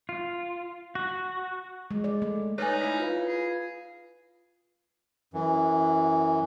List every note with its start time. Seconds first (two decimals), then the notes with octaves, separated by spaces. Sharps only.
0.09 F4
0.95 F#4
1.91 G#3
2.04 D5
2.22 A3
2.58 D#4 B4 C#5 D5 G#5 F6
2.83 E4
3.00 F4 B4 F5
3.28 G#4
5.34 F#2 E3